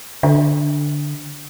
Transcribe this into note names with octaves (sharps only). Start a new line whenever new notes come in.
D3